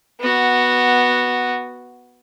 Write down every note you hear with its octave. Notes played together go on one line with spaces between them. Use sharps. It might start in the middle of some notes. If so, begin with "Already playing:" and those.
B3 F#4